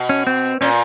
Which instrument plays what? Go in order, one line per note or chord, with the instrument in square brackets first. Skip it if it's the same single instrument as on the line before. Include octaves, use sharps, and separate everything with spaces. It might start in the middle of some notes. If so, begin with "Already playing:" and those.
Already playing: [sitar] B2
[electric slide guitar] C#4
C4
[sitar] A#2 [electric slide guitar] C#4